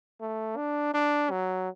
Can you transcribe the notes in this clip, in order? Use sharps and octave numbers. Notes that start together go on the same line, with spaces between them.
A3
D4
D4
F#3